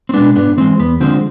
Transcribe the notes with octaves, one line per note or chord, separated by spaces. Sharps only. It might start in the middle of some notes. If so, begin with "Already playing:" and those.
C4
B2 G#3 B3 D4
G#2 B3 D4
E3 G#3 C4
E2 B3
D3 F3 G#3 C4